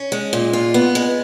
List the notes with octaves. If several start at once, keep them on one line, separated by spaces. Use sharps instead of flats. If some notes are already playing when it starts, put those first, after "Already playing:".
Already playing: C#4
G#3
A#2
F4
B3
G#3